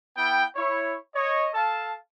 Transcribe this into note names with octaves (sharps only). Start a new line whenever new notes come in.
B3 E4 G5
E4 C#5
C#5 D#5
A4 F5 A5